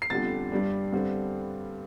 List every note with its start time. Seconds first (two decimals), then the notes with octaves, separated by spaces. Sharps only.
0.02 C7
0.10 G1 F2 D3 G3 A6
0.52 G2 G3 D4
0.92 G2 D3 G3 C4